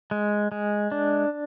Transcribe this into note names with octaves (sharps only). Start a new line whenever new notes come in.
G#3
G#3
D4